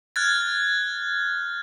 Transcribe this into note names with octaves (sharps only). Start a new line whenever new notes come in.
F6 F#6 G#6 A6